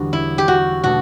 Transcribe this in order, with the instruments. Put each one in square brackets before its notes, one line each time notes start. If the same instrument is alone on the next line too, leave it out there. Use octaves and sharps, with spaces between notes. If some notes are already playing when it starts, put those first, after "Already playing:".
Already playing: [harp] E1 E2 D3 G3 D4 [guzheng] F#4
[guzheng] E4
G4
F#4
[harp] B2 A3 D4 [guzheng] F#4